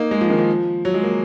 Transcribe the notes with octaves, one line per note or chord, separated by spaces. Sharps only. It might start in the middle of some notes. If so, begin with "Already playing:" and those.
Already playing: A#3 D#4
G#3
F3
D#3
F3
F#3
G#3
A#3